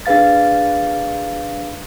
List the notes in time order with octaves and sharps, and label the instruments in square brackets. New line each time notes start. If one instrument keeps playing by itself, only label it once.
[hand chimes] D4 G#4 B4 F5 A6